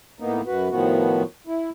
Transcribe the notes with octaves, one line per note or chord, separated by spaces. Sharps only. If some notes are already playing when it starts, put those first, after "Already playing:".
A2 A#3 B3 D#4
F#2 F#4 B4
A2 D#3 F3 B3 F#4
E4